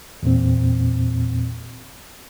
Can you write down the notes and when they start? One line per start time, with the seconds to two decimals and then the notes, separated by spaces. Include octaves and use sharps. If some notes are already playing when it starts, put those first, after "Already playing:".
0.23 E2 A#2 C4